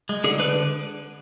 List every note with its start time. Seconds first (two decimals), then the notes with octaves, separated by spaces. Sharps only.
0.09 G#3
0.24 D3 G#4
0.39 D3 B4